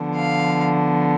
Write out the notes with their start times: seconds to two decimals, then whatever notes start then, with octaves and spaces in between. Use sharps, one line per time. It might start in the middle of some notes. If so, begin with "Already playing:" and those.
Already playing: D3 F3 B3
0.14 F5